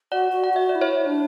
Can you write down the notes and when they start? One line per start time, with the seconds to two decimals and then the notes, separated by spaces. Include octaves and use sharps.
0.12 F#4 D5 F#5
0.32 F#4
0.44 F#5
0.54 F#4 E5
0.69 D5
0.75 E4
0.81 C#5 E5
1.06 D4